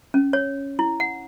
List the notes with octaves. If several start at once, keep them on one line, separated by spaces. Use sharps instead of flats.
C#4
C#5
E4
F#5